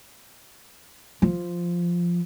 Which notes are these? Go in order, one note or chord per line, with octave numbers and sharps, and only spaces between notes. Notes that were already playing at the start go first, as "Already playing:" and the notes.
F3